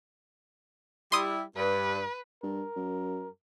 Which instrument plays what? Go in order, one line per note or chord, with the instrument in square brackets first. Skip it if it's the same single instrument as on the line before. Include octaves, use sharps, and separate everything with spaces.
[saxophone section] G3 E4 [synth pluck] C6 D#6
[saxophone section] G2 [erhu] B4
[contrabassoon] G2 [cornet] A#4
[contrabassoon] F#2